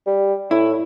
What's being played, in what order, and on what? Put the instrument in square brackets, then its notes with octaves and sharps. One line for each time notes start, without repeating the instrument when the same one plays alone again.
[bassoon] G3
[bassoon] A2 [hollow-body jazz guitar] E4